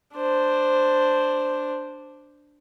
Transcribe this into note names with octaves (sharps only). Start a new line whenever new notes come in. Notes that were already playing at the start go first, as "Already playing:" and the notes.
D4 C5